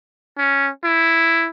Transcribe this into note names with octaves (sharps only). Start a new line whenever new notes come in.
C#4
E4